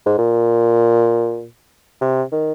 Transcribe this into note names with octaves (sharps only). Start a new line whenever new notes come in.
G#2
A#2
C3
D#3